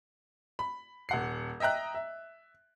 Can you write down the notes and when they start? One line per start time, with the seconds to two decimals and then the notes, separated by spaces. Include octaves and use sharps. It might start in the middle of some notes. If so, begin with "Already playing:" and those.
0.59 B5
1.09 D#1 F#5 C7
1.60 D#5 E5 G5 A#5 F#6
1.95 E5